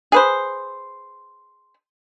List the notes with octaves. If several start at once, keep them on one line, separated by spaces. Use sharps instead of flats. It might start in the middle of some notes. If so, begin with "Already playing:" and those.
G#4 B4 C5